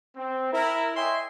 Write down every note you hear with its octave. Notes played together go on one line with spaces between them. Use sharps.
C4
E4 A#4
C#5 D#5 E5 G5 G#5 C6